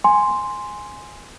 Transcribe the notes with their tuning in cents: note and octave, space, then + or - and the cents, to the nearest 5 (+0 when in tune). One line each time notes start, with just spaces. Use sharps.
G#5 +0 C6 +0